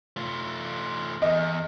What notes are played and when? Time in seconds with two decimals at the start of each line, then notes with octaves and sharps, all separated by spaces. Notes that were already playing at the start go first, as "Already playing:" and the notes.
0.16 A3 F4
1.22 E2 D#5